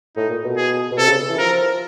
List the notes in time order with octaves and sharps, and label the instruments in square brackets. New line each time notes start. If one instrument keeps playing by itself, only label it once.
[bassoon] A2 [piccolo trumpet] D#4
[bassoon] A#2
B2
[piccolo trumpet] G#4
[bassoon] B2
[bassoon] C3 [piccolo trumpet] A4
[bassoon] C#3
E3
[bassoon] F3 [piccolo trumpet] A#4